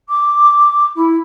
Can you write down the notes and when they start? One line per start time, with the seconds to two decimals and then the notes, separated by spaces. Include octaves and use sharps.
0.09 D6
0.95 E4